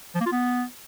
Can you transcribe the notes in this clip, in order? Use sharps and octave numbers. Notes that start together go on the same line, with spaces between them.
F3
A#3
F4
B3